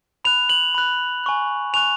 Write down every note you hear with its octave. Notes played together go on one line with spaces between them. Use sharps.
B5 F#6 F7
F#7
B5 F#6
G#5 C#6 F#6
G#5 C#6 F#6 F7